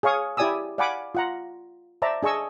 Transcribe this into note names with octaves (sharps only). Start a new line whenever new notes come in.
G#4 C#5 F5 C#6 D#6
E4 G4 D5 G#5 D#6 E6
D5 F5 F#5 G#5 B5 D6
F4 F#5 A#5
C5 D5 E5 A5 A#5
D4 G#4 D#5 C#6 E6